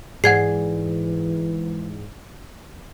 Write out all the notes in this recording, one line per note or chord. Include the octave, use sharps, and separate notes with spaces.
G#2 E3 G#4 D5 F#5 G#6 C7